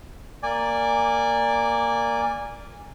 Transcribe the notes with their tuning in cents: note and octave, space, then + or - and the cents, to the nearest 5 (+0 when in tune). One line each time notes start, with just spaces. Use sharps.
A#3 -5 D5 +0 G#5 -20